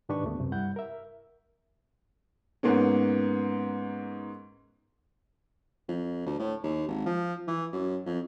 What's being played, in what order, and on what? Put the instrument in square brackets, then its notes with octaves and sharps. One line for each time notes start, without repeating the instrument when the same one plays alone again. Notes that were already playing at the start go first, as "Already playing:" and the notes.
[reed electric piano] G#2 D#3 D4 G4 B4 C#6
D2 A3 B3
F#2 C3
G2 G3 E4 F#5 G6
A#4 E5
[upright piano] G#2 A#3 B3 C#4
[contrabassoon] F2
D2
A2
D#2
G#1
F3
E3
F#2
F2